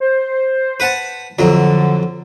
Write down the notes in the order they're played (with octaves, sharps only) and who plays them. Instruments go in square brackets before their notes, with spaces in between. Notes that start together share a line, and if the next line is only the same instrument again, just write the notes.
[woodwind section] C5
[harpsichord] B4 F#5 A5
[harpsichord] F2 F#3 [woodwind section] D3